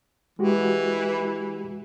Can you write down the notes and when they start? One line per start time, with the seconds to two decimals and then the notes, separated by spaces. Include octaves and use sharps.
0.39 E3 G#3 F#4 G4